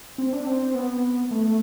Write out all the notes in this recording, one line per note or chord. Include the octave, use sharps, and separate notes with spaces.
C4
D4
C4
B3
A3